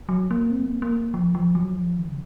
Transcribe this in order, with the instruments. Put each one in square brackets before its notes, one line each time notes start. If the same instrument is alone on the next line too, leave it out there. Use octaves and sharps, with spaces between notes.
[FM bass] F#3
A#3
C4
A#3
A#3
F3
F3
F#3
F3
D#3
C#3